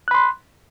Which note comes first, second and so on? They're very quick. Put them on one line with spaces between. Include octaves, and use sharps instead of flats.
F#6 B5 C6